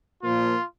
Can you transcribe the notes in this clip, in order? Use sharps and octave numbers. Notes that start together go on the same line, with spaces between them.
A#2 F3 A#3 F4